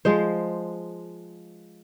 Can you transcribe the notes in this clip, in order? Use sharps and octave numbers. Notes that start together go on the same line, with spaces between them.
F3 G#3 C5